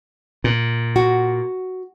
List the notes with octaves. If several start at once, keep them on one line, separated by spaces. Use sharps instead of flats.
A#2
F#4